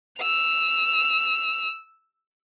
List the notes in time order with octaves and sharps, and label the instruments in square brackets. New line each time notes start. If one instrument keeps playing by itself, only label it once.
[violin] E6 F7